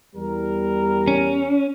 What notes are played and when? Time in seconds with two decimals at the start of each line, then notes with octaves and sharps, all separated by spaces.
0.15 E2 G3 A#4
1.07 C#4